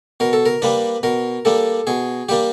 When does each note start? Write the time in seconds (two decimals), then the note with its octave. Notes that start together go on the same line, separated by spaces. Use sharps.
0.20 B2 A#4
0.33 A4
0.46 A#4
0.62 G3 A#3 D4 B4
1.03 B2 A#4
1.45 G3 A#3 D4 A4
1.87 B2 G#4
2.29 G3 A#3 D4 G4